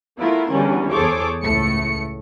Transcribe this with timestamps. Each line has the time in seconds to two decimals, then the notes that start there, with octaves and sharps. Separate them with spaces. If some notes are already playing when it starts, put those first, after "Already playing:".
0.19 A3 B3 E4 F4 A#4
0.51 E2 D3 G3 C#4
0.91 E2 G#4 A4 C5 C#5 D6
1.42 C#2 A2 A3 C#7